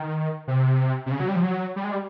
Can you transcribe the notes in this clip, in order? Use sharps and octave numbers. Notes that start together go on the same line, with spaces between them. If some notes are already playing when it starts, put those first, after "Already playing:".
Already playing: D#3
C3
C3
C#3
F#3
G3
F3
F#3
G3
G#3
G3